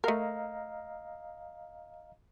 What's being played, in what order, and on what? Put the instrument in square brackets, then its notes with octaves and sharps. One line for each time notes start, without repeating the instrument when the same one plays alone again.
[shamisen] A3 A#4 [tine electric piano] D#5 F5 A#5